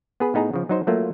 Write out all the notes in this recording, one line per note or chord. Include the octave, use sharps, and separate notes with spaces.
B3 G#4 B4
A2 B3 D#4 G#4 A#5
C#3 F3
F#3 D#4 C5
F#3 A3 A#3 F4